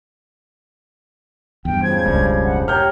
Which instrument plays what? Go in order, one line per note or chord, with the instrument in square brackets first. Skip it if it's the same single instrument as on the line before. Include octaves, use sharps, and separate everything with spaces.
[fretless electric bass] E2 G2 [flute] G5
[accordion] C#3 F3 C5 [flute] G#6
[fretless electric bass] E1 C#2 [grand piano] G2
[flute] F#5
[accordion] G4 A#4 [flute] C#5 [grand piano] F6 G6